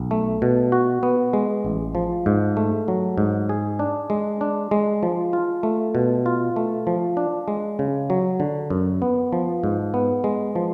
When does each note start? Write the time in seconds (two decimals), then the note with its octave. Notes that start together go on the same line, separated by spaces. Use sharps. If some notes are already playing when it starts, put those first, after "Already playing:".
Already playing: B1
0.11 A3
0.42 B2
0.72 F#4
1.03 B3
1.33 G#3
1.64 A1
1.95 F3
2.26 G#2
2.57 A3
2.88 F#3
3.18 G#2
3.49 G#4
3.79 D4
4.10 G#3
4.41 D4
4.71 G#3
5.03 F3
5.33 F4
5.63 A3
5.95 B2
6.26 F4
6.56 A3
6.87 F3
7.17 D4
7.48 G#3
7.79 C#3
8.10 F#3
8.40 D3
8.70 F#2
9.02 B3
9.32 F3
9.64 G#2
9.94 B3
10.24 G#3
10.56 F3